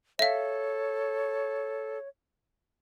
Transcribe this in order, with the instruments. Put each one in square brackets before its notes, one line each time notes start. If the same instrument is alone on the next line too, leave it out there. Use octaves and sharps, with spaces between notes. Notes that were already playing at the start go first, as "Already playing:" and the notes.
[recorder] A4 [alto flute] C#5 [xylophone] E5 F5